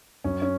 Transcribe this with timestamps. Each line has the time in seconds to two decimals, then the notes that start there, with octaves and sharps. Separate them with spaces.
0.24 F#2 C#4
0.42 C#4